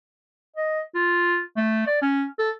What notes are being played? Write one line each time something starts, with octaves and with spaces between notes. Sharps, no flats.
D#5
F4
A3
D5
C#4
A4